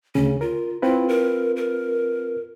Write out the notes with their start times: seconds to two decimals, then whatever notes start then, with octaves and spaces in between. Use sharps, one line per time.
0.15 D2 C#3 C#4
0.41 F4 A#4
0.82 C4 E4 F4 B4
1.09 A#4
1.57 A#4